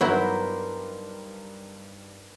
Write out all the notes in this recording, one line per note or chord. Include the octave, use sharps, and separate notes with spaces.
G2 F#3 B3 D#4 E4 A#4 C5 B5